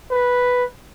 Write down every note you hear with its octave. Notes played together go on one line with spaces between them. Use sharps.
B4